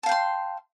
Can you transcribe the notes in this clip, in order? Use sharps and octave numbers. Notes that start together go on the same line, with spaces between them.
F5 G5 A5 C6